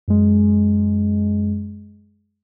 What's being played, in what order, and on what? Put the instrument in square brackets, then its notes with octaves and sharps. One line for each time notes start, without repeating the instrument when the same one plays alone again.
[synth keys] F#2 G#3